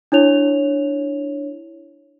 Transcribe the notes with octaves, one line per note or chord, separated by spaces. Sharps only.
D4 E4 C#5 F7